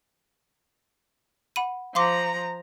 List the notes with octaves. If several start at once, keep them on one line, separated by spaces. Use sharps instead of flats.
F#5 B5 D#7
F3 F5 A#5 C6 D6